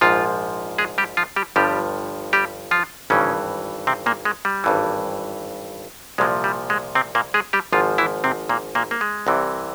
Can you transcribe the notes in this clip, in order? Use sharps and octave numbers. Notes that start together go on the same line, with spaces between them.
A#1 G#2 F3 F4
G#3 G#4
G3 G4
F3 F4
G3 G4
G1 G2 F3 G3 G4
G3 G4
F3 F4
G#1 G2 C#3 E3 C#4
C3 C4
A#2 A#3
G#3
G3
G#1 G2 E3
C2 A#2 F3 G#3
G3
G#3
C3 C4
A#2 A#3
G#3 G#4
G3 G4
G#1 G#2 F3 F4
E3 E4
C3 C4
A#2 A#3
A#2 A#3
A#3
G#3
C2 C3 E3